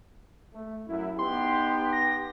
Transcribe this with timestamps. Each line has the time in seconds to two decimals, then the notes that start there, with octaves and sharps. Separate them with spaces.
0.54 A3
0.88 F#2 E4
1.19 B3 D#4 G4 C6
1.93 A#6